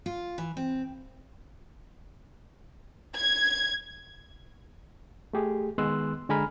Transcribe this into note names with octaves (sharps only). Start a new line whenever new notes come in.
F4
E3
C4
G#6
A3 G4 G#4
D#3 G#3 B3 C6 E6 F#6
D3 G#3 G#5 A#5 B5 F6